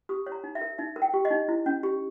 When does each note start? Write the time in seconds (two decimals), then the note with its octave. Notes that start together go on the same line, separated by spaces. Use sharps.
0.09 G4 D#6
0.27 C#5
0.32 A#5
0.44 D#4
0.55 E5
0.61 A#4
0.78 D#4 E5
0.96 A#4
1.02 G5
1.14 G4
1.25 D#5
1.31 D#4
1.48 E4
1.66 C#4
1.83 G4